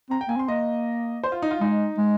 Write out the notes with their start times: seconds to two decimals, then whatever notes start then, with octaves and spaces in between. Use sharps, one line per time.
0.10 C4 A#5
0.21 G5
0.28 A#3 G#5
0.36 C4 C6
0.48 A#3 D#5
1.24 C5
1.32 F4
1.42 D#4
1.51 F4
1.61 G#3 D#4
1.98 G#3